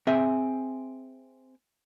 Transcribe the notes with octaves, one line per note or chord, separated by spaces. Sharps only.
C4 G#4 E5